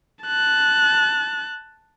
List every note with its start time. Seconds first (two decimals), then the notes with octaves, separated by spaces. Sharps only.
0.24 A5 F#6